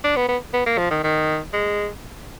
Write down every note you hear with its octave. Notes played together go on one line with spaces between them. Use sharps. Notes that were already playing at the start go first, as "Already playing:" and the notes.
D4
B3
B3
B3
A#3
F3
D#3
D#3
G#3